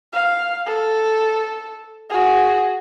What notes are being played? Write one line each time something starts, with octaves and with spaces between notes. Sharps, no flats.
F5
A4
F#4 G#4